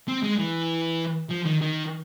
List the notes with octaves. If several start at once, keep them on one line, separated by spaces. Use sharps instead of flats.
C4
G#3
E3
F3
D#3
D#3